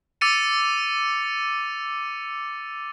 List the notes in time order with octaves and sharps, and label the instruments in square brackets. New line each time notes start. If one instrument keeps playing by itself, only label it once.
[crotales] D6 E6 A6 C#7 D#7